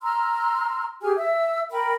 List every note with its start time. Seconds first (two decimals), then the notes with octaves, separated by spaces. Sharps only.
0.02 A#5 C6 E6 F6
1.01 G4 G#4 G#5 F6
1.18 E5 E6
1.71 A#4 G5 B5